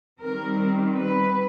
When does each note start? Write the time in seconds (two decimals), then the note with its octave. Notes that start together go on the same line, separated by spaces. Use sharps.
0.20 D#3 G3 C4 A#4
0.98 B4